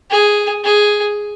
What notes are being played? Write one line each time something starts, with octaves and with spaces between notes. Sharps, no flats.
G#4
G#4